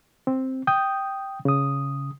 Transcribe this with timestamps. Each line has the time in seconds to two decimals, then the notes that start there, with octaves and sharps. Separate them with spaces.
0.27 C4
0.67 G5 D#6 G6
1.45 C#3 D#6